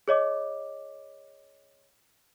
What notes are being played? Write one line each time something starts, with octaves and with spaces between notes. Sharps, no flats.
G#4 C#5 D#5 D6